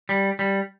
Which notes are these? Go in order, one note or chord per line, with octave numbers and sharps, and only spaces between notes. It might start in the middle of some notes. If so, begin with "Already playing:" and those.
G3
G3